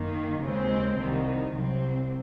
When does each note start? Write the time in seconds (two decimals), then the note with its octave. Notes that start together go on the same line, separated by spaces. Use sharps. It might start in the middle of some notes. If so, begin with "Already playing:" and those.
Already playing: F#2 D#3 A#3
0.41 D#2 C#3 G#3 C4
0.99 C2 C3 D#3
1.55 C2 C3 F#3 C4